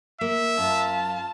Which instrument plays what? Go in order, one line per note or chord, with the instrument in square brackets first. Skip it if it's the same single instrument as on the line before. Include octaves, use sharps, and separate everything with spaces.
[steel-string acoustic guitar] A#3 [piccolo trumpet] E5
[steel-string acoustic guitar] F#2 [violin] F4 A5